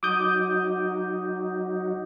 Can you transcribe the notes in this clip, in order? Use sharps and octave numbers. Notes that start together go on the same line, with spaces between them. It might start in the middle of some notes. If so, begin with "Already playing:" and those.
F#3 D#4 F#4 D6 D#6 G6